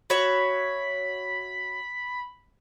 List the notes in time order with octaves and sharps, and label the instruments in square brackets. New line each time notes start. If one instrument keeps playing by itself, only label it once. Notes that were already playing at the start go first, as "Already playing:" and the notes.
[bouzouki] F#4 C#5 E5 [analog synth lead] B5